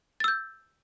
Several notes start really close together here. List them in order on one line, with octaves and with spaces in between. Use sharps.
A6 E6 G6